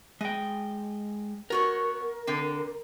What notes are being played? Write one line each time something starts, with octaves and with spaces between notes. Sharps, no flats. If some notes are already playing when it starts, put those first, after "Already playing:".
G#3 D#5 G5
B3 F#4 A#4 C#5
D3 C4